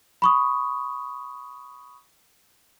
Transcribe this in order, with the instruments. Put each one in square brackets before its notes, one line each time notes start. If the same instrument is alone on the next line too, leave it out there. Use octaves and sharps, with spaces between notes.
[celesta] B5 C#6 D#6